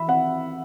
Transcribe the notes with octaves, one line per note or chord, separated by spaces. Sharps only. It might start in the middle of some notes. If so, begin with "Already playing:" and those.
Already playing: E3 E5 B5
C4 F#5